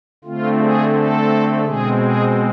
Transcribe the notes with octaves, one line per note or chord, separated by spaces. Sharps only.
D3 A3 C4 F4
G#4
A4
B2 G#3 C4 G#4
G#4